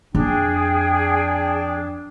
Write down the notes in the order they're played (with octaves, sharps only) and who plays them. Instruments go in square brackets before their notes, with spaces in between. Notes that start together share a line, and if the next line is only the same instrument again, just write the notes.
[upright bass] F2 [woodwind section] D4 [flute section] G#4 G5